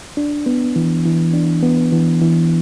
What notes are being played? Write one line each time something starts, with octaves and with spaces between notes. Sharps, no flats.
D4
B3
E3
E3
D4
B3
E3
E3